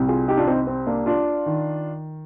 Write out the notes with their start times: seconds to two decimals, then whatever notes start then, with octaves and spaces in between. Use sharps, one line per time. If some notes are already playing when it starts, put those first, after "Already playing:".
Already playing: C2 C3 G3
0.08 F4 G#4
0.28 D#4 G4
0.37 D4 F4
0.47 C4 D#4
0.67 C4
0.87 A#3 D4
1.06 D4 F4
1.46 D#3